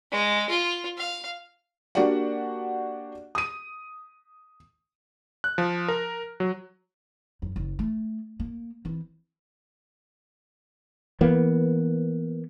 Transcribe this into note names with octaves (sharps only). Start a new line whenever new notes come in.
G#3
F4
F5
A#3 D4 F#4 G4 D5 F#5
D#6 D#7
F#6
F3
A#4
F#3
F#2
F#1
A3
A#3
E3 C4
E3 A#3 B3